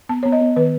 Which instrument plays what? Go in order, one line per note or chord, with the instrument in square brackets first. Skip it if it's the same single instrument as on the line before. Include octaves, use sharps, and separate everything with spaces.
[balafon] B3 A5
B3 C#5
D#5
B3
D#3 B4